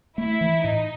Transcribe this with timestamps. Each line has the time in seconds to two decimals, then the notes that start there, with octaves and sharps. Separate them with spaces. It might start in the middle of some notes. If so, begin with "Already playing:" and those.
0.18 A3 E4
0.41 E3
0.64 A2 D#4